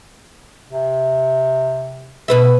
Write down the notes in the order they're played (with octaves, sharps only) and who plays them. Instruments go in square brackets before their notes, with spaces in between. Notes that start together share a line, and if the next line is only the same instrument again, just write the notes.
[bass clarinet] C3
[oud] B2 B4 E5